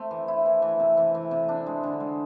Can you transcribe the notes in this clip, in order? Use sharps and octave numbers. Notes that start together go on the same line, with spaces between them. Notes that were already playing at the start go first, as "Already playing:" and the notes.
Already playing: A3 C4
E3
E4
E3
E3
C3
E3
E3
C3
D4
G#3
D3
G#3